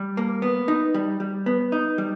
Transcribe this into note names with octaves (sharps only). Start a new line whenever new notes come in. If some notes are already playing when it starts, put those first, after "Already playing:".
Already playing: G3
A#3
B3
D#4
G3
G3
B3
D#4
G3